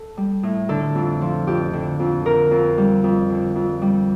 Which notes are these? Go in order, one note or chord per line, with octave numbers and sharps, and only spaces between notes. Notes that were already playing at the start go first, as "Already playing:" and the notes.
Already playing: A4
G3
A2
D3 A4
F2
F3
F2 G4
D3
F2
D3 A#4
F2
G3
F2
D3
F2
G3